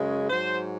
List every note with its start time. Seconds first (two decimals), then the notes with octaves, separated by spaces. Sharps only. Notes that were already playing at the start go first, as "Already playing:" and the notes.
Already playing: F#2 C#3 G#3
0.29 G#2 F#3 C5